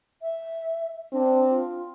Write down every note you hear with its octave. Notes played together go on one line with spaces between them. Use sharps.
E5
C4 D4
F4